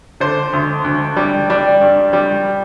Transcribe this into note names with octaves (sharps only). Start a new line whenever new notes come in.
D3 C5
D2
D2
G3
G3 D4
G2
G3